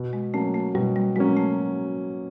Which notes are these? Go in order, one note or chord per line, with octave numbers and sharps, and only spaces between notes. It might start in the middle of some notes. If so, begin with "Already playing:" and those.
Already playing: B2
G#3
F#3 A3 A#3 C#4
A3
B2 G3
G3
F#3 G#3 A#3 C#4
A3